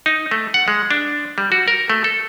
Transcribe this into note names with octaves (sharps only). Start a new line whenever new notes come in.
D#4
A3
F#5
G#3
D4
G3
F#4
A#4
A3
A4